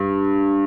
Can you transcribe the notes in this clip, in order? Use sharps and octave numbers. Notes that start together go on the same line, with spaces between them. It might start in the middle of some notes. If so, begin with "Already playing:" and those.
Already playing: G2